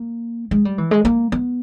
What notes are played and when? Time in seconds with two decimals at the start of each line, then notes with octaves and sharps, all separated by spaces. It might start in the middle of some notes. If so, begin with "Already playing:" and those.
Already playing: A#3
0.51 G#3
0.65 G3
0.78 E3
0.91 G#3
1.05 A#3
1.32 B3